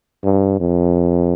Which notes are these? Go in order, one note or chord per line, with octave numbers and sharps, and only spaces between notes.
G2
F2